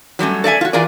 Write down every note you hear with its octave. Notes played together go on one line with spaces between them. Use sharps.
F#3 G3 A3 C#4
A4 D5 E5 G#5
F4 F#4
E3 F4 G#4 A#4 D5